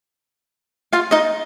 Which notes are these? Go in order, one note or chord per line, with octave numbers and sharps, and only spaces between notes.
F4 F5
D#4 D#5